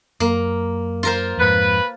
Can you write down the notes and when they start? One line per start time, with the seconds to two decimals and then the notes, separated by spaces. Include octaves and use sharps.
0.20 F#2 A#3
1.03 F4 A#4 C5
1.38 F2 G#2 B4